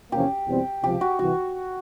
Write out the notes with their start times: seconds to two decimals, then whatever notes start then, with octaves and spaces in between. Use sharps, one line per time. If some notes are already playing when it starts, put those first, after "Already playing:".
0.12 E2 C3 F3 A#3 C#4 G4
0.47 E2 B2 G3 C4
0.84 C#2 C3 F3 G4
1.01 F#4
1.19 C2 C3 E3 F#4